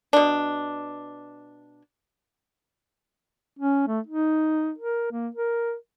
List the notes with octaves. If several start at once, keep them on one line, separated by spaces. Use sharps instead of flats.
B2 D4
C#4
A3
D#4
A#4
A#3
A#4